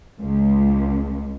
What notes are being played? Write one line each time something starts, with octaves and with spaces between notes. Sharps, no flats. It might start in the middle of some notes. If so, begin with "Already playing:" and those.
C#2